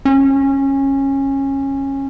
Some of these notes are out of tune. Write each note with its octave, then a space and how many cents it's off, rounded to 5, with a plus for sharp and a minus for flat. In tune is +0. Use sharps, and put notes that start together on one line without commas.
C#4 -20